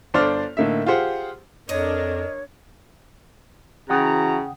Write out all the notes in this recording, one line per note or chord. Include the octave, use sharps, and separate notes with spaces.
G1 D4 C5 D5 D6 F6
A2 D3 A#3 D#4 E5
F4 G4 G#4 C5 F#5
F2 D4 A#4 C#5 D#5
C#3 E3 F#4 F#5 G5 A#5 D#6